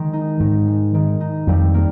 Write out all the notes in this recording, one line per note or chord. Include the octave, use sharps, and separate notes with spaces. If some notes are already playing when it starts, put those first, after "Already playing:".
Already playing: D#3 G#3
D#4
G#2 D#3
G#3
D#3
D#4
F2 G3
A#3